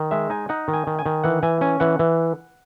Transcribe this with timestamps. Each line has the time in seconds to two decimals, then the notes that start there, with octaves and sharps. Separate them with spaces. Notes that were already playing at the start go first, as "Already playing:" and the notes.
Already playing: D#3
0.11 G#3 E5
0.30 D#4 G#5
0.49 D#4 F#5
0.68 D#3
0.73 G#5
0.87 D#3
0.99 G#5
1.06 D#3
1.24 E3 F#5
1.43 E3 G#5
1.61 C#4 G#5
1.80 E3 F#5
1.99 E3